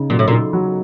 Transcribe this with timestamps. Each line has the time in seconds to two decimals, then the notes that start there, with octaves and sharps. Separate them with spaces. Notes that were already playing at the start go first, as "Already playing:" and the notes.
Already playing: C#3 D#4
0.10 A#2 F#3
0.19 A2
0.28 A#2
0.31 D#4
0.53 F#3